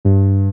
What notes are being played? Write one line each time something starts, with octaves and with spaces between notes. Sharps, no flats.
G2